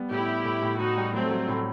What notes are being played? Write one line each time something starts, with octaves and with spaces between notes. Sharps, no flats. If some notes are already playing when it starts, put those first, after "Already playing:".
Already playing: G3 B3
A2 E4 G4
B3
A2
A2
A2 D#4 F#4
G3
F#3 A3 C4
F#3
A2